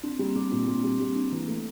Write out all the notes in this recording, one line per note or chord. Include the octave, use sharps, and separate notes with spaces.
C4 D4
G3 A#3
C4
G3 D4
A#2
A#2 C4
G3
G3
D4
E3 A#3
A3